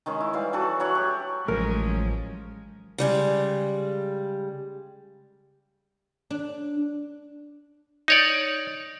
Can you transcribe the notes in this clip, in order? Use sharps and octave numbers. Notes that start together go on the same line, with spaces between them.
D#3 G#3 C#4
E4
E3 G3 F5
E3 F#3 F#4 A4
F#3 E4 C#5 F#5
G4
A1 F3 F#3 G#3 C#4 A#4
C#3 G3 G#3
D4
D#4 C#5 D5